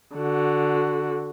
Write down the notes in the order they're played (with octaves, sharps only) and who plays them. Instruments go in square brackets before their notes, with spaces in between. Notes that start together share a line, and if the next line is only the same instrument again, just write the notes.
[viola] D3 F#4